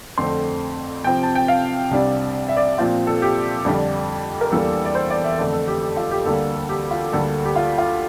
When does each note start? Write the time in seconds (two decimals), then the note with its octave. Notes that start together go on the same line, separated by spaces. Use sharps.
0.17 F2 D3 A3 C4 C6
1.04 C3 F3 C4 G5
1.23 A5
1.35 G5
1.48 F5
1.91 C2 C3 G3 D4
2.49 E5
2.57 D5
2.78 A#2 F3 C4 F4
3.07 A4
3.22 G4
3.65 F2 D3 G3 D4
4.41 A#4
4.52 E2 E3 G3 A#3 D4 A4
4.85 D5
4.95 C5
5.10 D5
5.24 E5
5.39 F2 D3 A3 E5
5.53 A4
5.68 G4
5.82 G4
5.96 F4
6.11 G4
6.26 D2 D3 G3 A#3 A4
6.69 G4
6.90 F4
7.13 D2 D3 G3 A#3 A4
7.45 G4
7.55 F4
7.78 F4